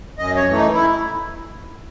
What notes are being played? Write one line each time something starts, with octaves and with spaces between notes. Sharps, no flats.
F#2 D#5
C#5
E3 A3
D#4
E4